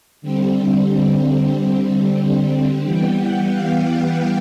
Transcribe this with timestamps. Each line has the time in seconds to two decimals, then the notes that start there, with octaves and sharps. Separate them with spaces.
0.22 D3 G3 C4
2.84 E3 G3 B3 G5
3.17 F#5
3.50 F5